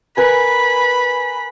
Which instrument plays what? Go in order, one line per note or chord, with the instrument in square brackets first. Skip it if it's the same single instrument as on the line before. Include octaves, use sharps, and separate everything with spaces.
[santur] A#4 B4 G#5 [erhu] B5